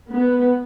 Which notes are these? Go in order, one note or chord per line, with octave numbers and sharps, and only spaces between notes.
B3